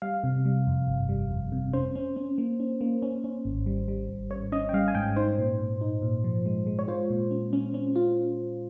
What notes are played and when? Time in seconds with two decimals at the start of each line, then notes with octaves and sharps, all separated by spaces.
0.02 G3 F5
0.23 C3
0.45 G3
0.67 F2
0.87 G1
1.09 G3
1.31 F2
1.52 C3
1.73 C#4 C5
1.95 C#4
2.16 C#4
2.38 A#3
2.60 C#4
2.81 A#3
3.02 C#4
3.24 C#4
3.45 G#1
3.66 G3
3.88 G3
4.09 G#1
4.31 G#1 C#5
4.52 C#4 D#5
4.69 G5
4.73 G3 F5
4.88 G#5
4.95 G#2 G5
5.16 D#4 C5
5.38 A#2
5.59 A#2
5.81 D#4
6.02 A#2
6.24 F3
6.46 G#3
6.67 G#3
6.79 C#5
6.88 F4 C5
7.10 A#2
7.31 C#4
7.53 C#4
7.74 C#4
7.96 F4